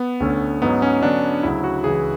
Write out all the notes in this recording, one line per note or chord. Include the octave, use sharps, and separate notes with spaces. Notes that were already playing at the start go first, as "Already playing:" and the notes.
Already playing: B3
D2 D3 A3 C#4
G#2 F#3 B3 C#4
C#4
D3 F#3 B3 D4
D2 C#3 F#3 E4
F#4
C#2 C#3 E3 G#4